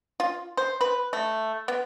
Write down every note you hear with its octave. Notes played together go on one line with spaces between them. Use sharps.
F4
C5
B4
A3
B3